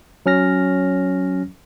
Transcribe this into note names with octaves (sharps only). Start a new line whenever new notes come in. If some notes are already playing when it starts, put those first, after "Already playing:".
F#3 C#4 F6 A#6